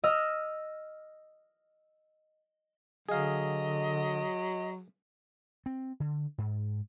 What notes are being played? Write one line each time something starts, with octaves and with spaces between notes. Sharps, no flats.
D#5 E6 F6
D3 F#3 G#4 D#5 F5
C4
D3
G#2